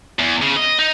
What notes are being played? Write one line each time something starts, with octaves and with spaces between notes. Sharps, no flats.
E2
C#3
D#5
D#4